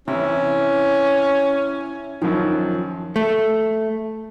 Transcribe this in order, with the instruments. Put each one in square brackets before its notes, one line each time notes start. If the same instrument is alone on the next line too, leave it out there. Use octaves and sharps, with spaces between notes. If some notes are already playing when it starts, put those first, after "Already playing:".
[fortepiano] C3 E3 [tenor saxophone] C#4 [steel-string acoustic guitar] E4
[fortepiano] F#2 D#3 [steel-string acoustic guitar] F3
[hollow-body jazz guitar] A3